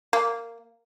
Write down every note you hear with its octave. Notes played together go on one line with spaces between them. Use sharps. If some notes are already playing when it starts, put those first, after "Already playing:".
A#3